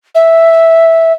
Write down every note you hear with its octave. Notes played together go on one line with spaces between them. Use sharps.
E5